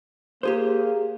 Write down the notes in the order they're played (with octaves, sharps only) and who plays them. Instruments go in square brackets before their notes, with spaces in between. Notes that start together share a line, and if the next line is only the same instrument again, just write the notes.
[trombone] A#3 [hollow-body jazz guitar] G4 G#4 C5